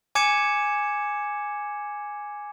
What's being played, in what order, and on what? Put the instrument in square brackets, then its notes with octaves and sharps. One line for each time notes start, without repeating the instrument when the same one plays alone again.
[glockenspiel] G#5 D6 G#6 C#7 E7